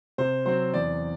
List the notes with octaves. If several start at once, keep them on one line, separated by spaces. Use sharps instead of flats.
C3 C5
F#3 C4 C5
E2 D5